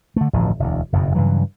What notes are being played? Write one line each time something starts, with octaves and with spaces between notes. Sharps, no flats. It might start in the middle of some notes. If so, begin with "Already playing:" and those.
D3 A3
D1 A1 G2 F3
E1 D2
F#1 F2 B2
G2 C#3 E3 F#3